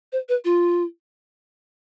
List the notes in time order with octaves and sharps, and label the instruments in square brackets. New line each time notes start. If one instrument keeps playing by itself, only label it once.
[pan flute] C5
B4
F4